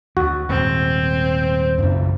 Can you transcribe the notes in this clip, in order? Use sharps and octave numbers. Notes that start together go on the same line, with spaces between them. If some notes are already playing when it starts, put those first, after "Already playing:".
D2 F#4
D#1 G#2 C4
F#2 C#3 D4